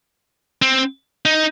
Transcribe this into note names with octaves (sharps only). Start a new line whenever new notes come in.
C4
D#4